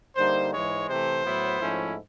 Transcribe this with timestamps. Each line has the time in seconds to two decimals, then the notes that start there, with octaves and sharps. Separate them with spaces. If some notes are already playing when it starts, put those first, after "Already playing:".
0.16 D3 G3 A#3 D#4 C5
0.53 G#2 E3 G#3 C#5
0.88 C3 E3 A3 C5
1.25 A2 F#3 B3 E4
1.60 G#2 F3 A3 C#4 E4